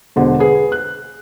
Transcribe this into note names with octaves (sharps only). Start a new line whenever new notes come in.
E1 B2 D3 C5
G#4 B4
F#6